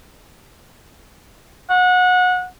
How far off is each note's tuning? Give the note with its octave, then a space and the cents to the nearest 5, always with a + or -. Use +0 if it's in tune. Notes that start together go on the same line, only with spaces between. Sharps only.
F#5 -25